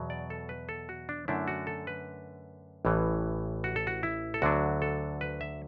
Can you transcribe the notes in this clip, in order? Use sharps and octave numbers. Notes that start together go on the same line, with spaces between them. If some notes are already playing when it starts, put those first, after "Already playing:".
Already playing: E2 B2 F#3
D5
A4
B4
A4
F#4
D4
F#2 D3 A3 D4 E4
F#4
A4
B4
A1 A2 E3
F#4
A4
F#4
E4
A4
D2 D3 F#3 D4 F#4
A4
B4
E5